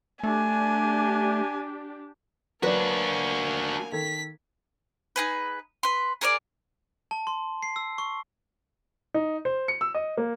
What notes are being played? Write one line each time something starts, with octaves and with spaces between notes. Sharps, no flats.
A3 D4 G4 G#5
F#3 A#3 D4 F#4 B4 D5 G#5
D#3 A4 G#6 B6
D#4 G#4 B4
B4 C6
G#4 A#4 C#5 D5
A5
C6
C7
E6
C#6
D#4
C5
C#7
E6
D#5
A#3